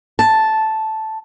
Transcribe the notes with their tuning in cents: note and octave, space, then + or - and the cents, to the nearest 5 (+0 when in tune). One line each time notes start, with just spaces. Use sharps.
A5 -5